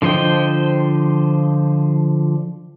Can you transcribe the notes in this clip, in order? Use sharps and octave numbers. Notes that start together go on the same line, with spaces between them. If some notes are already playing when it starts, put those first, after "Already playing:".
D3 F3 C5 D#5 G5